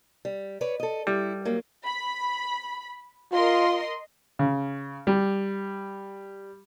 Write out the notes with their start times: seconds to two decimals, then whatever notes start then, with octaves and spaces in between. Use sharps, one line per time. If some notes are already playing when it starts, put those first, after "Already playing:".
0.25 G3
0.61 B4 C#5 D5
0.80 A4 D#5
1.07 G3 E4
1.45 F#3 A#3
1.85 B5
3.32 F4 A#4 D#5 C6
4.39 C#3
5.07 G3